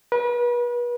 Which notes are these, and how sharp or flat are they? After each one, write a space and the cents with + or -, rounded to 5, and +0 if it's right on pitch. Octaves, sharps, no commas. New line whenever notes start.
B4 -35